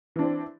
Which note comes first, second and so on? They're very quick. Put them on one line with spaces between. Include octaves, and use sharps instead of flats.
E3 D4 C4